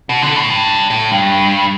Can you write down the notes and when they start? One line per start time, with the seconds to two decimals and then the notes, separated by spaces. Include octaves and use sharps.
0.09 B2
0.22 D3
0.36 A2
0.50 G2
0.90 A2
1.11 G2